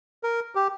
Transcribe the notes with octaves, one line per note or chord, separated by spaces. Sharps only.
A#4
G4